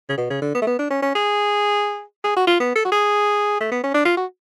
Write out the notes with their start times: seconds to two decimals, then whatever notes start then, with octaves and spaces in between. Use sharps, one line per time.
0.09 C#3
0.17 B2
0.30 C#3
0.42 D3
0.54 B3
0.62 A3
0.67 B3
0.79 D4
0.91 C#4
1.02 C#4
1.15 G#4
2.24 G#4
2.36 F#4
2.47 F4
2.60 B3
2.76 A4
2.85 F#4
2.92 G#4
3.60 A3
3.71 B3
3.83 C#4
3.94 D4
4.05 F4
4.17 F#4